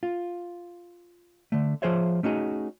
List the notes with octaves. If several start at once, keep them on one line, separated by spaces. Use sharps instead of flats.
F4
D3 A3
F3 F4 G#4 C5 C#5 E5
A3 C#4 D#4 F#4 G#4